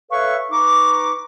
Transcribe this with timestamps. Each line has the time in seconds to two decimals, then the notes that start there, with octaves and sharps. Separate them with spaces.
0.11 A4 B4 C#5 E5 F5 C#6
0.51 D#4 B4 A#5 C#6 D6